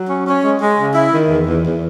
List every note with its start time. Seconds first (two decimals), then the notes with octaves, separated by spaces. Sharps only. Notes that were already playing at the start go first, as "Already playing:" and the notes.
Already playing: F#3
0.09 C#4
0.26 C#4
0.44 G#3
0.61 G#3
0.78 C#3
0.95 E4
1.12 D#3
1.30 E2
1.46 E2
1.64 E2